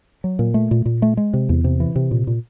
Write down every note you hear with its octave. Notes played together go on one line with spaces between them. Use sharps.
F#3
A#2
A3
A#2
A#2
A3
G#3
C3
E2
C3
E3
C3
A#2
A#2